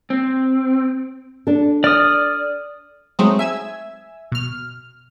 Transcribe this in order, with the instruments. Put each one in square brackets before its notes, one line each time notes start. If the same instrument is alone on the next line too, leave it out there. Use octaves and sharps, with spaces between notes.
[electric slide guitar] C4
[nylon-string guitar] D4 A4
[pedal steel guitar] D5 D#6 [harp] F6
[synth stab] F#3 G#3 A3 C4 D#4
E5 G#5 E6
B2 F6